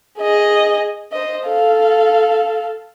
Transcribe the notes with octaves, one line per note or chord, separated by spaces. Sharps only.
G#4 D#5
C5 D#5
A4 F5